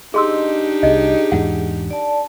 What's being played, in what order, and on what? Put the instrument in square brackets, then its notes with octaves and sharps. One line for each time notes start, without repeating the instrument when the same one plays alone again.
[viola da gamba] D4 D#4 G4 [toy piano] G#4 C6 E6 [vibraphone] D#5
[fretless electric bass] C2 [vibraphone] G#4 [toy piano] D#5
[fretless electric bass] E2 G#2 E3 [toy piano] F#5
[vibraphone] D5 A5